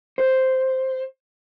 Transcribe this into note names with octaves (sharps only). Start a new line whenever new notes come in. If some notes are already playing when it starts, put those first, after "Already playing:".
C5